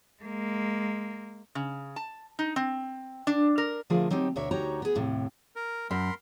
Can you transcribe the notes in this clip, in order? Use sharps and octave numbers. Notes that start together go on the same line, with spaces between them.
G#3 A#3
C#3
A5
D#4
C4
D4
A#4
D3 F3 A3 F4 G#4 A#4
F#3 C4 D#4 G4
D2 B2 D4 A#4 C#5 E5
D2 D#4 F#4 G4 C#5 A#5
B3 G#4
D#2 A2 C3
A#4
F#2 A#4 B5 C6